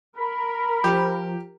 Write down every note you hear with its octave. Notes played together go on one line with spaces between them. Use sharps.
A#4 B5
F3 G4